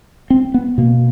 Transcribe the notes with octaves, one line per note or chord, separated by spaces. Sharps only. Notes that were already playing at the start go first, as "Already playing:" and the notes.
C4
B3
B2 A#3